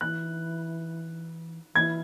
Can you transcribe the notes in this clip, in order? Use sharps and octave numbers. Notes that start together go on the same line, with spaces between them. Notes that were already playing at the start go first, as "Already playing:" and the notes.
E3 F#6
E3 G#6